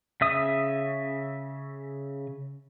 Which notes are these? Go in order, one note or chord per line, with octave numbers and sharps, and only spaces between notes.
C#3 E5 D#6